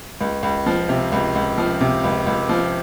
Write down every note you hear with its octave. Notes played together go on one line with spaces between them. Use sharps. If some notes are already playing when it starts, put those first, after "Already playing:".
C#2
C#2
F3
C3
C#2
C#2
F3
C3
C#2
C#2
F3